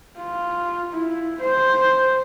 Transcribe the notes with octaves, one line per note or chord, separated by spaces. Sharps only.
F4
E4
C5